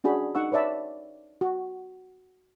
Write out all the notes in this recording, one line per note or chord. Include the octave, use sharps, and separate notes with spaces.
C#4 D4 F#4 G#4 B5
D#4 F#5 C#6 E6
B4 C#5 D5 E5 A5
F#4